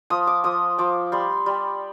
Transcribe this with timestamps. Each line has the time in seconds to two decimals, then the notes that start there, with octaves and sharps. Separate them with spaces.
0.10 F3 D#6
0.27 D6
0.44 F3 D#6
0.78 F3 D6
1.12 G3 C6
1.46 G3